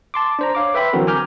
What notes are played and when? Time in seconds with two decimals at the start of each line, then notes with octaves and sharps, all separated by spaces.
0.14 A5 C6 D6
0.39 D4 C5 A#5
0.55 C#5 F5 D6
0.74 B4 E5 G5 B5 C6
0.93 D3 E3 F#3 C4 F#4 A#4
1.07 G#5 A#5 D6 F6 G6